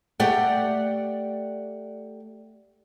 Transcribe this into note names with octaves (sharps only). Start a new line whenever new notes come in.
A3 G4 D5 F#5 G5